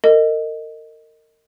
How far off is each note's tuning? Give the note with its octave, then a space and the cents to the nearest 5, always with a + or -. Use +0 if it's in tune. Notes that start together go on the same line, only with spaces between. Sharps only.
A#4 -35 D#5 +0